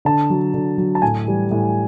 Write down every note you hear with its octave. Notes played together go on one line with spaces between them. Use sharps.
D3 A5
F#3
D3
F#3
A5
A2 G#5
E3 G3
A2